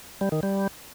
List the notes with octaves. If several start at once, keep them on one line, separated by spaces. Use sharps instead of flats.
G3
D#3
G3